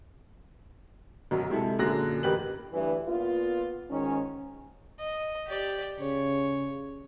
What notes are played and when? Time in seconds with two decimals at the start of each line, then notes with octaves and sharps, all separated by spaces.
1.31 B1 F#2 F#3
1.50 C3 G#3 E4 A4
1.79 F#2 A#2 D3 G#4 F#6 A#6
2.23 A1 G4 A#4 B4 F#7
2.71 D2 G2 E3
3.06 A#2 B3 F4
3.89 G#2 D#3 C#4
4.99 D#5
5.48 G4 D5
6.00 C#3 C#5